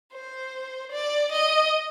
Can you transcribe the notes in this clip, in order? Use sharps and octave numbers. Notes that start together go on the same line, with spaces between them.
C5
D5
D#5